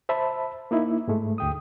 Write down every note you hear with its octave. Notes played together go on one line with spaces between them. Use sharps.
C5 E5 A5 B5
A#3 D#4 E4
G#2 G#3 A3
D2 G5 D#6